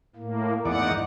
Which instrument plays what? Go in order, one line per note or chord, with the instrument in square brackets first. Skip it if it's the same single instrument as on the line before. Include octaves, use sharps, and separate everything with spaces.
[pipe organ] A2 A#3
[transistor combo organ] E2 D5 [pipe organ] G#2 D#4 F#5